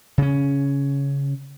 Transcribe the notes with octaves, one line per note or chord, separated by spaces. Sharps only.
C#3 C#4